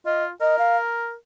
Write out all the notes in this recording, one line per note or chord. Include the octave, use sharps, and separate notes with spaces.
F4 D#5
A#4 D#5
F5